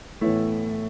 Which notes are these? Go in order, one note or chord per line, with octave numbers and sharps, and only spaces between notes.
A2 E3 A3 B3 E4 C#5